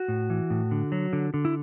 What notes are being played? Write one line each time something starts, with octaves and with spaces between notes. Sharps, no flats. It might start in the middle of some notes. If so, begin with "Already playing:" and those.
Already playing: F#4
A2
E3
A2
D3
F#3
D3
D3
E4